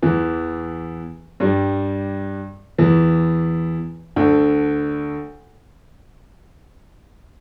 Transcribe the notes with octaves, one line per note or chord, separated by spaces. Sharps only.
E2 E3
G2 G3
E2 E3
D2 D3